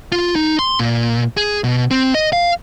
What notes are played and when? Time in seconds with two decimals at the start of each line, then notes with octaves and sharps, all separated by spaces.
0.12 F4
0.36 D#4
0.59 C6
0.80 A#2
1.37 G#4
1.64 B2
1.91 C4
2.15 D#5
2.33 F5